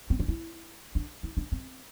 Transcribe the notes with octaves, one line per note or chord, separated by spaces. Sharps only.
C4
D4
E4
D4
E4
D4
C4